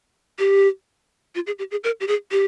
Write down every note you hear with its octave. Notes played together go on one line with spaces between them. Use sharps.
G4
F4
G#4
G4
G#4
A#4
G4
G#4
G4